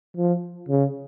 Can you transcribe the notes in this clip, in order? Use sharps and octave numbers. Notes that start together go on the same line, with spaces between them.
F3
C#3